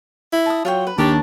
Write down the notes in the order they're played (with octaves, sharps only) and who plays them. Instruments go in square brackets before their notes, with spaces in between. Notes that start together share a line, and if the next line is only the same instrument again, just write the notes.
[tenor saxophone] E4
[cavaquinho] A5 D#6
[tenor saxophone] F#3 [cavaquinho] F4 C#5 G5
[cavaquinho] B4
[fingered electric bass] D#2 [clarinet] D4 [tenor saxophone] G4 [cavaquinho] A#4 C#5 A5